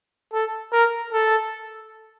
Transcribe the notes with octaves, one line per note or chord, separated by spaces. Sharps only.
A4
A#4
A4